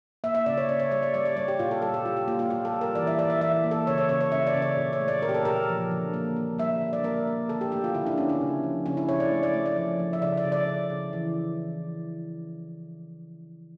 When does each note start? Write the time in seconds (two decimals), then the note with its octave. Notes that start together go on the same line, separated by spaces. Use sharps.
0.24 A#3 E5
0.35 E5
0.46 C#3 D5
0.58 C#5
0.69 C#3 D5
0.80 C#5
0.91 G3 C#5
1.03 D5
1.14 G3 D5
1.25 D5
1.37 G3 C#5
1.48 G4
1.59 A#2 F4
1.71 A4
1.82 G3 A4
1.94 G4
2.05 G3 F4
2.17 G4
2.28 A#3 F4
2.39 F4
2.50 G3 G4
2.65 A4
2.73 G3
2.81 A#4
2.95 E3 D5
3.07 E5
3.19 E3 D5
3.30 E5
3.41 E3 E5
3.64 A#3
3.71 A4
3.87 C#3 C#5
3.98 C#5
4.09 C#3 C#5
4.21 C#5
4.32 C#3 E5
4.47 D5
4.55 C#3
4.62 C#5
4.77 A#2
4.93 C#5
5.00 A3
5.08 D5
5.22 A#2 A#4
5.29 G4
5.34 A4
5.45 A#2 A#4
5.68 F3
5.91 D3
6.13 A#3
6.36 A#3
6.58 G3 E5
6.81 D3
6.93 D5
7.04 A#3 A#4
7.27 A#3
7.49 D3 A4
7.61 G4
7.72 A3 G4
7.84 F4
7.95 D3 E4
8.06 D4
8.17 D3 C#4
8.29 C#4
8.41 C#3
8.63 F3
8.86 C#3 C#4
8.97 E4
9.08 C#3 C#5
9.20 D5
9.31 A3
9.43 D5
9.54 A3
9.66 D5
9.76 F3
9.99 F3
10.13 E5
10.22 C#3 D5
10.37 D5
10.45 C#3
10.52 D5
10.67 C#3
10.90 C#3
11.13 E3